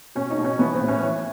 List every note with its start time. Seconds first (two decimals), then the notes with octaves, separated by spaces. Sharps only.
0.15 B2 C#4
0.30 D#4
0.38 B2
0.45 C#4
0.59 E3 B3
0.74 C4
0.81 A2
0.88 C#4
1.03 E3